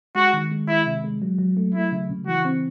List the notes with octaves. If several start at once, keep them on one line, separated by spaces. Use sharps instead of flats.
G#3 F#4
D#3
G#3
G#3 E4
C3
G#3
F#3
F#3
A3
A3 E4
C#3
C#3
E3 F#4
C4